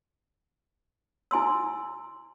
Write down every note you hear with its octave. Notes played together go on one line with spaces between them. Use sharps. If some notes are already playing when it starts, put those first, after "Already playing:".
E4 G#5 C6 E6